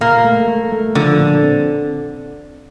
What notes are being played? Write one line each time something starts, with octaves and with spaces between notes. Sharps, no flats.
A#2 A#3
A3
A3
A3
D3 F3
A#2
C4